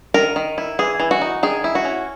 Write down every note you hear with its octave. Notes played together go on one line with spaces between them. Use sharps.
D#3 A#4
D#3
E4
E3 G#4
E3
F#4
D#4
D#3 G#4
E4
F#4
C#4